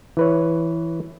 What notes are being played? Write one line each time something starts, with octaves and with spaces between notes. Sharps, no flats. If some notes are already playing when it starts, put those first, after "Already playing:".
E3 B4 C#5